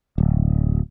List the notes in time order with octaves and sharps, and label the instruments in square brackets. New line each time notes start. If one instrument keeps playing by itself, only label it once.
[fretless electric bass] D1